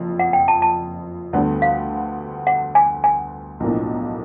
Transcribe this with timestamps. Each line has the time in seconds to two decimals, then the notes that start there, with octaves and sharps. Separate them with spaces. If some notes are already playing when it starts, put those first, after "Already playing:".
Already playing: F#1 F2
0.19 F#5
0.33 G5
0.48 A5
0.62 A5
1.33 D2 D3 G3 B3
1.62 F5
2.47 F#5
2.75 G#5
3.04 G#5
3.60 B1 A2 F3 A#3 D4